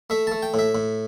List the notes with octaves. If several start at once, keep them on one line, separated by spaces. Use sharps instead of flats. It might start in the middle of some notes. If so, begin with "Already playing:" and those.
A3 E5
A3 A5
G5
A2 E5
A2